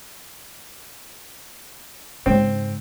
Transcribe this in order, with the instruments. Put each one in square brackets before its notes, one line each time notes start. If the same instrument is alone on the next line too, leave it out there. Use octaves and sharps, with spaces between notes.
[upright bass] G#2 C#3 [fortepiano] C4